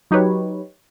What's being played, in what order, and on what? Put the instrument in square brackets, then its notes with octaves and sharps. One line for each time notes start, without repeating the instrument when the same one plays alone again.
[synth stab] F#3 D#4 G4 B4 C#5